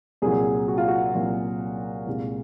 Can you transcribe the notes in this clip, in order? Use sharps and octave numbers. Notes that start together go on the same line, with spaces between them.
C2 A#2 F#3 G#4
F#4
F4
F#4
C2 A#2 F#3 F4
C2 A#2 G#3